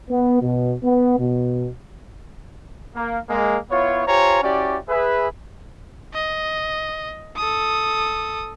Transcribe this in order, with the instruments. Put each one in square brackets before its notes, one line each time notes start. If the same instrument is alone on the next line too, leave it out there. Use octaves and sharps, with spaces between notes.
[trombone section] B3
B2
B3
B2
[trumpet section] A#3
G#3 A#3
B3 E4 F4 C#5
F4 G4 C5 C#5 G#5 A#5
C#4 E4 F#4 G4 D5
G#4 B4 E5
[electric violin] D#5
A4 D#6